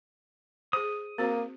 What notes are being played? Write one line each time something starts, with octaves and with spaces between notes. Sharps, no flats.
G#4 C5 D#6
A#3 C4 F#4 C5